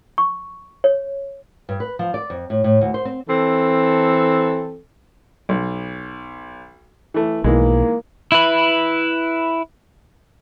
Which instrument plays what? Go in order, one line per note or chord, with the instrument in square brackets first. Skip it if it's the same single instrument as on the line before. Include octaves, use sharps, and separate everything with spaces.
[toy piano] C#6
C#5
[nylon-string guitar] G2
B4
F3
D5
F2
A2
A2
D2
C5
C4
[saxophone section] E3 C4 A4
[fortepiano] B1
E3 A3
[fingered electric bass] B1 [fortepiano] D#3 E3 G#3 [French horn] A#3
[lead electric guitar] E4 B4